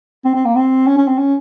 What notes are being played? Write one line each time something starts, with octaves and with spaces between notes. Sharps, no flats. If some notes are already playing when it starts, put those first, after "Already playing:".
C4
C4
A#3
C4
C#4
C#4
C4
C#4